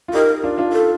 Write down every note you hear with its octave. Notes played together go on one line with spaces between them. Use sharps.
F4
D#4 G4 A#4
D4 F4
D4 F4
A4